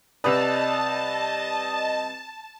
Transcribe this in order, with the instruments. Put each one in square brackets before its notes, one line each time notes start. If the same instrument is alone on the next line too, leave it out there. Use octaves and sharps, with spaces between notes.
[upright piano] C2 B4 [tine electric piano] D5 E6 [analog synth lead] D#5 [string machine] A5